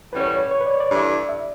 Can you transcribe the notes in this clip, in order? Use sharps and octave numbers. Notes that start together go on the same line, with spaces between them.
A2 E3 G3 C#4 F#4 B4
C#5
B4
C#5
B4
D5
C#5
D5
G2 E3 A3 E4
E5